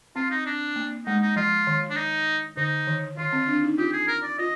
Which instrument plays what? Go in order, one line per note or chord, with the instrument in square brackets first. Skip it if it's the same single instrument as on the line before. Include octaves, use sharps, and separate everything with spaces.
[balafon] C4 [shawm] F4
[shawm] D#4
D4
[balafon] A#3
[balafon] G#3 [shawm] D#4
[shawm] D#4
[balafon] F3 [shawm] F4
[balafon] D#3
[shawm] D4
D#4
[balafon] D3 [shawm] D#4
[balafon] D#3
[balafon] D#3 [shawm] F4
[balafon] C4
D4
D#4
[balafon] F4 [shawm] G4
[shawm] G#4
A#4
D5
[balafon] F4 [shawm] D#5